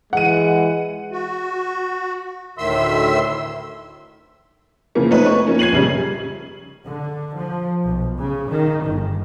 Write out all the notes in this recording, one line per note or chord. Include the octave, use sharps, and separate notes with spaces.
E3 G#3 F#5 D#7
F#4
D2 A2 D#3 E5 C6 E6
C#3 E3 F3 A#3
A3 B3 C4 D#4 B4 C#5
C#6
F3 A#3 C#4 D#4
G#6 C7 D#7 F#7
A#1 C#3 G3
D3
F3
B1
C#3
D#3
G1